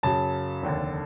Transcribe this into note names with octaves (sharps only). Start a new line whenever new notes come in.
F#2 C#3 F#3 A5
F1 D#2 D3